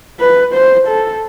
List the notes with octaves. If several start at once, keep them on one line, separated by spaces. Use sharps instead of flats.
B4
C5
A4